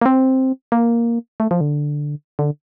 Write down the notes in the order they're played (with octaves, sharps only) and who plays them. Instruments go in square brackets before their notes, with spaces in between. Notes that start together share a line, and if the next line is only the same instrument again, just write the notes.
[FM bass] A#3
C4
A#3
A3
F3
D3
D3